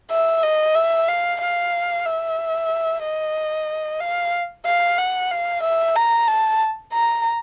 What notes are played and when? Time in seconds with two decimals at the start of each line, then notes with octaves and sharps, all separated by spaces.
0.11 E5
0.43 D#5
0.75 E5
1.08 F5
1.41 F5
2.05 E5
3.03 D#5
4.00 F5
4.65 F5
4.98 F#5
5.30 F5
5.63 E5
5.96 A#5
6.28 A5
6.93 A#5